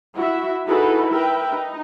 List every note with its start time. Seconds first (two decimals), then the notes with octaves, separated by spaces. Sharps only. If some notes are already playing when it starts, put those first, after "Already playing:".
0.15 E4 F#4 E5
0.66 D#4 E4 F#4 G#4 A4 B4
1.11 A#4 B4 E5 G5
1.51 D#4